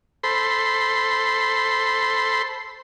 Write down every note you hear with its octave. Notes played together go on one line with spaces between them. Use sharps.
A4 C5 B5 C6